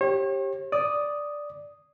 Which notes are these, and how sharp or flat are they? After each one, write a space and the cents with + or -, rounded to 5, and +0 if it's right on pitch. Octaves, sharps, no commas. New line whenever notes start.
G4 +0 C#5 -40
D5 +0 D#6 +0